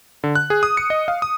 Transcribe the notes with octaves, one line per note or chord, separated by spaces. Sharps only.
D3
F#6
G#4
D#6
C#7
D#5
F5
D#6